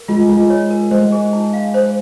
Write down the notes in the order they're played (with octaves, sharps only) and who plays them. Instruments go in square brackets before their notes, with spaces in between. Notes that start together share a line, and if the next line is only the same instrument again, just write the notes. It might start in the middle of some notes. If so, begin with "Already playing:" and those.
Already playing: [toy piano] A#4
[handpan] G#3 [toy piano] F4
[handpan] G#3 [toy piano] F4
[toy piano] C#5
A#4
[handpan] G#3 [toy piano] C5
[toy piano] G#4
D#4
F5
C5